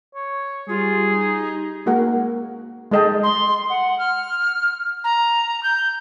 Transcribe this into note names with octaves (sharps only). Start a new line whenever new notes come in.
C#5
G3 F4 G#4
D#4
G#3 A#3 F#4 A#4 F#5
G#3 A4 D#5 G5 A5
C6
F#5
F6
A#5
G6